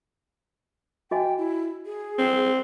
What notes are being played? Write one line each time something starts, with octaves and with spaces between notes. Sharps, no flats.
F#4 D#5 G5 G#5
E4
G#4
C4